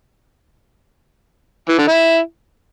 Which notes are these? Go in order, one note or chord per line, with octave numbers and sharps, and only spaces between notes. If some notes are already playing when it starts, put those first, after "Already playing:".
E3
D3
E4